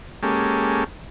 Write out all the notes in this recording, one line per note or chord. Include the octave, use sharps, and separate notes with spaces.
G#3 A#3 C#4 G4 A4